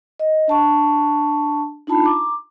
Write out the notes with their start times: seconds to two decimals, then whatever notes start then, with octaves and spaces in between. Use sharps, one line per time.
0.19 D#5
0.48 D4 A5 C#6
1.87 D4 D#4 F4 A5 B5
2.02 A#5 D6